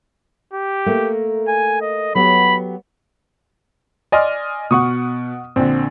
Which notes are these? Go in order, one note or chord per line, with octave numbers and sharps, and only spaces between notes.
G4
A3 A#3 A#4
G#5
D#5
F#3 B3 G4 B5
D5 D#5 G#5 C6 F6
B2 F#5 C#6 D#6
A#1 D3 C4